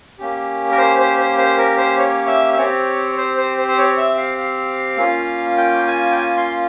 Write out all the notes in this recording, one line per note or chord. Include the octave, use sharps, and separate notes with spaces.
A#3 C#4 G4
A#4
C5
C5
C5
C5
A#4
C5
C#5
E5
E5
C4 G4 C#5
C5
C5
C5
C5
C#5
E5
F5
F5
A#3 C#4 F4
G5
G#5
G5
G#5
C6